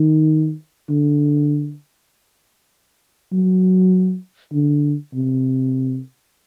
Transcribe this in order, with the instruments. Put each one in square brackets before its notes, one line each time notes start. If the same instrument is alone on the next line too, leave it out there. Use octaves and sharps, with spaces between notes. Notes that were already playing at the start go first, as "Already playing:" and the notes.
Already playing: [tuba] D#3
D3
F#3
D3
C3